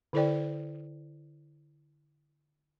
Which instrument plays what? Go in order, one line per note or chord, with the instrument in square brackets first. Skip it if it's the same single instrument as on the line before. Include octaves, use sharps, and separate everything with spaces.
[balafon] D3 E4 A4 C5 D5 G5